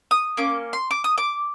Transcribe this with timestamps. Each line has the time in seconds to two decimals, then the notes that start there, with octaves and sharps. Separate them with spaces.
0.11 D#6
0.37 A#3 C#4 D6
0.73 C6
0.91 D6
1.04 D#6
1.18 D6